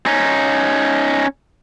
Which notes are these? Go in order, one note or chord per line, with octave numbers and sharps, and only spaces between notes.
C#4 D#4